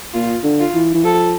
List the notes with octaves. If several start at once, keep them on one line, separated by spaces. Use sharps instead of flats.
A#2 F4
D3
F4
E3
E3
F3 A4